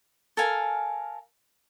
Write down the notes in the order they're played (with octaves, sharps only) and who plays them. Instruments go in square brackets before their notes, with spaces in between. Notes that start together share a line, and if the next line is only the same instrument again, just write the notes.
[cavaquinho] A4 A#4 F5 G#5